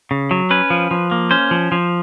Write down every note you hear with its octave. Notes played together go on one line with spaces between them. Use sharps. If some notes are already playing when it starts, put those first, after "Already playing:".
C#3
F#3
C#4 B4
F3
F3
A#3
C#4 C5
F3
F3